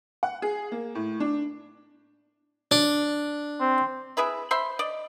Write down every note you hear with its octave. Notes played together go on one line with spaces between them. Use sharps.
F#5
G#4
A#3
A2
D4
D4
C4
E4 G#4 B4 E5
C5 E5 B5 C6
D5 D#5